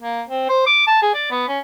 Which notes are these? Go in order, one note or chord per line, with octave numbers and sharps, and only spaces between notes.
A#3
C4
C5
D6
A5
G#4
D5
B3
C#4